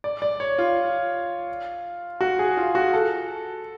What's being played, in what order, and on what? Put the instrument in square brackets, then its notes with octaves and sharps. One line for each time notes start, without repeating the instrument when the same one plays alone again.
[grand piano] D5
D5
C#5
F4
F#4
G#4
F4
F#4
A4